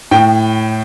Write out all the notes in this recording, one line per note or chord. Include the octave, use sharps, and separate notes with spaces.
A2 G5